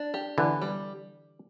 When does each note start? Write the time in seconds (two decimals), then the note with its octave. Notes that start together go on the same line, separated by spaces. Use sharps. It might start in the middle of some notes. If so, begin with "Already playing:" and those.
Already playing: D4
0.14 G4
0.38 D3 E3 B3
0.61 G3